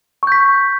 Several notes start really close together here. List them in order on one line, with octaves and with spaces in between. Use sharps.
C#6 G6 B6